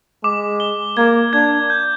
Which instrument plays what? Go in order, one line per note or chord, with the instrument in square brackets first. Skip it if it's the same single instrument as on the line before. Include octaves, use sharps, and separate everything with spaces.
[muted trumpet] G#3 [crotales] D6
[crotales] G7
[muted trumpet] A#3 [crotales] G#6
[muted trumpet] D4 [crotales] G#6
[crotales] G6